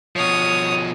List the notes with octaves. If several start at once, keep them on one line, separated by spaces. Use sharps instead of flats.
B2 F3 C#5 D#6